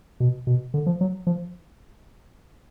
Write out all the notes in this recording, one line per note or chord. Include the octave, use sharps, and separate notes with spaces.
B2
B2
D3
F3
F#3
F3